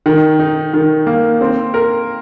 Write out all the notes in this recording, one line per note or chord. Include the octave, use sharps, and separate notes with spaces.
D#3
D#4
D#3
A#3
C4
A#4